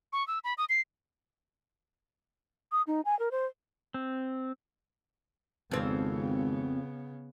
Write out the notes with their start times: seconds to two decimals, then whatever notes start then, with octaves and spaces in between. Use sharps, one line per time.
0.13 C#6
0.27 E6
0.44 B5
0.58 D#6
0.69 C7
2.72 D#6
2.87 D#4
3.05 G#5
3.19 A#4
3.31 C5
3.94 C4
5.71 G#1 F2 C#3 B3 C4